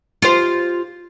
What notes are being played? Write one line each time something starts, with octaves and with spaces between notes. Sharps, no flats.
F4 G4 C5